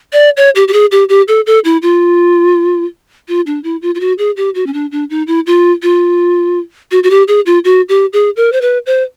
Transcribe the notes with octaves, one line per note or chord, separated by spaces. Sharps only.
D5
C#5
G4
G4
G#4
G4
G4
A4
A4
E4
F4
F4
D4
E4
F4
F4
F#4
G#4
G4
F#4
C#4
D4
D4
D#4
E4
F4
F4
F#4
F#4
G4
G#4
F4
F#4
G4
G#4
A#4
C5
B4
C5